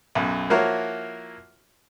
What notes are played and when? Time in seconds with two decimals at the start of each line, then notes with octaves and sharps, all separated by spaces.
0.15 B1 F#2
0.50 F3 A#3 E4 F#4 A#4 C#5